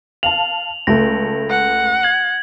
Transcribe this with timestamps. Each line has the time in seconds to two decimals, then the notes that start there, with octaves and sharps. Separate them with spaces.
0.23 F5 A5 F7 F#7
0.87 C#2 A3 A#6
1.50 F#5
2.03 G#6 F#7